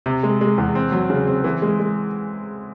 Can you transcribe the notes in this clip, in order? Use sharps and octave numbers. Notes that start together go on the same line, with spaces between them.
C3
G#3
G#3
E2
C4
F#3
C#3
C4
E3
G#3
G#3